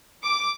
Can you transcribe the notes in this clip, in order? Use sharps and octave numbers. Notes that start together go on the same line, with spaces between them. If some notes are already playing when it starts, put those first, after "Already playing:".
D6